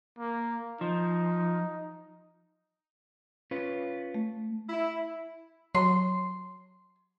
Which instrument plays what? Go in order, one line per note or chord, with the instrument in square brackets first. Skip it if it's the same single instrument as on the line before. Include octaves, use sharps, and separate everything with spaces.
[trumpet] A#3
[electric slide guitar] F3 [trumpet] D#4
[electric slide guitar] C#4 F4 B4
[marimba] A3
[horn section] E4
[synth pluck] F#3 [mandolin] C6